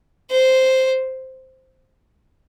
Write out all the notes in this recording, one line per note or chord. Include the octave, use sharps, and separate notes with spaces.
C5